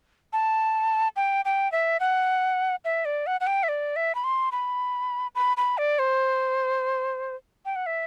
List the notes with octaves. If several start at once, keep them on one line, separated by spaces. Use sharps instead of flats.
A5
G5
G5
E5
F#5
E5
D5
F#5
F#5
G5
E5
D5
E5
B5
C6
B5
B5
B5
D5
C5
G5
F#5
E5